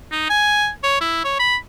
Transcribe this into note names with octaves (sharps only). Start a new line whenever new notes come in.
D#4
G#5
C#5
E4
C#5
B5